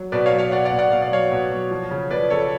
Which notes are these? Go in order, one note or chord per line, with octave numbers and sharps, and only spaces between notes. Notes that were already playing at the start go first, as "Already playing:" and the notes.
Already playing: F#3
B2 B4 D5
C#5 F5
F#3
C#5 F5
B2 D5 F#5
D5 F#5
B2
D5 F#5
B2 F5
D5
F#3 C#5 F5
B2
F#3
F3
C#3
F3 B4 D5
C#3 A4 C#5